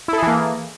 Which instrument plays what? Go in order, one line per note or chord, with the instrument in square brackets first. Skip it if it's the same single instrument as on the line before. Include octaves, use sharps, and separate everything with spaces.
[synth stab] E4
A4
G#4
E3
A#3